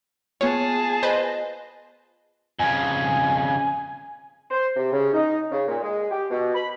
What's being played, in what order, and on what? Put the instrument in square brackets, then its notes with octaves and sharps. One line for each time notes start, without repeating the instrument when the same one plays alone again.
[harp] B3 F4 [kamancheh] G#4 A5 [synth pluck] C#5
[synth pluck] B4 C5 [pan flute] D#5
[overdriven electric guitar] F2 C#3 [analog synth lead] G#5
[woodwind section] C5
C3
C#3
D#4
C#3
A#2
G#3
G4
B2
B5